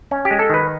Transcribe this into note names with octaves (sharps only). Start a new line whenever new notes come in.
C#4
G4
G#3
A4
D#3 B4